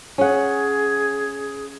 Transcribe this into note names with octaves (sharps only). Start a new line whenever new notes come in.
C#4 G#4 F#5